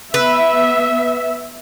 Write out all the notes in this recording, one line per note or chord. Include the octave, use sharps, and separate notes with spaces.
B3 B4 E5